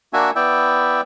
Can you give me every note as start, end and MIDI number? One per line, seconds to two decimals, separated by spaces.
0.13 0.31 58
0.13 0.31 62
0.13 0.31 66
0.13 0.31 76
0.13 0.31 80
0.35 1.01 59
0.35 1.01 64
0.35 1.01 74
0.35 1.01 76
0.35 1.01 79